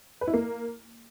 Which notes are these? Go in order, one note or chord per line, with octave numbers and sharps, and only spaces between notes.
B4
E4
A#3